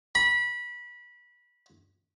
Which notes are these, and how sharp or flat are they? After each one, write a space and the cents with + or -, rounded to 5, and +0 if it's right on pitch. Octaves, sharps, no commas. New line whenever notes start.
B5 -25